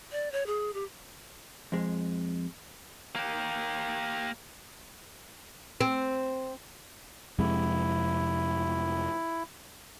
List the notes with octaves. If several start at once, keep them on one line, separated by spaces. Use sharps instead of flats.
D5
C#5
G#4
G4
F2 G#3
A#3 G4
C4
F2 C3 G#3 E4